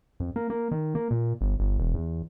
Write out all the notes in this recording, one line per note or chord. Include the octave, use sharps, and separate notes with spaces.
F2
A#3
A#3
D#3
A#3
A#2
G1
G1
E1
E2